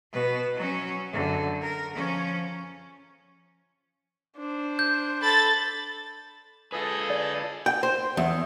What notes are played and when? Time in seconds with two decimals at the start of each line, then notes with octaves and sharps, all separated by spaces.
0.13 B2 B4
0.55 F#3 C#4
1.12 F#2 D3
1.61 A#4
1.94 F3 C#4
4.37 D4 C5
4.79 G6
5.22 A4 B5 A6
6.72 F4 G#4 A4 B4 D#5
7.10 D5
7.66 G5
7.83 C5
8.17 E2